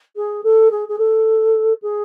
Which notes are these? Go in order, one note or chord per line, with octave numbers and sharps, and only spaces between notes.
G#4
A4
G#4
G#4
A4
G#4